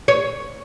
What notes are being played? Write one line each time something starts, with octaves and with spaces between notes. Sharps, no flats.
C#5